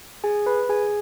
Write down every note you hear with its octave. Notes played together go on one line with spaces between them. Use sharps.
G#4 G#5
B4 B5
G#4 G#5